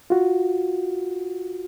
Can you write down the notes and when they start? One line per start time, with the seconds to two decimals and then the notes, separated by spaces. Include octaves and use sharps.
0.10 F4 F#4